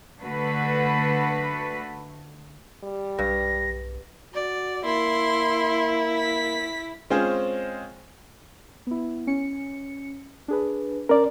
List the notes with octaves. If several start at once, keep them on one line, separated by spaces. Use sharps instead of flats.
D3 A3 F#4 B4
G3
B1 G2 A#6
F#4 D5
A#3 E4 C6
B6
G#3 C4 C#4 F4 G#4 C5
B3 E4
C#4 C#7
D4 G#4 B4
C#4 A#4 D5